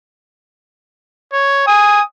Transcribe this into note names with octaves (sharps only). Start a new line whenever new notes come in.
C#5
G#5 D#6